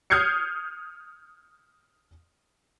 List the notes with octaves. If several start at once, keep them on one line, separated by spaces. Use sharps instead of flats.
D#6 F6 G6 G#6 C7 C#7